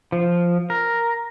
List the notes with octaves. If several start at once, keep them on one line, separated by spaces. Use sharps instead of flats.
F3
A#4